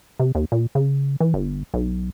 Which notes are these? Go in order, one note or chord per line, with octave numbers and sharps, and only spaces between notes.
C3
D#2
A#2
C#3
E3
G1
B1